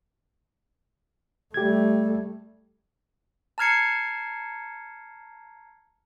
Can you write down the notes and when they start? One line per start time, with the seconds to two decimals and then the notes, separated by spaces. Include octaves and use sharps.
1.54 G3 A3 G4 G#6
3.58 A5 A#5 F6 G#6 C7 C#7